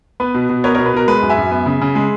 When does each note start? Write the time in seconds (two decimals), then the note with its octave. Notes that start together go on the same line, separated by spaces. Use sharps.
0.20 B3 B4
0.34 B2
0.49 B2
0.64 B3 A#4 C#5
0.75 B2 A#4 C#5
0.86 B4
0.94 B2 A#4
1.07 G#3 B4
1.22 F#2
1.30 E5 G#5
1.37 F#2
1.51 B3
1.66 C#3
1.81 C#3
1.95 G#3